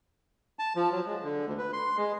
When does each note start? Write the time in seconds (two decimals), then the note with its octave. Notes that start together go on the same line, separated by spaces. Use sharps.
0.59 A5
0.76 F3
0.92 F#3
1.06 G#3
1.23 D3
1.45 D2
1.58 B4
1.73 C6
1.97 G#3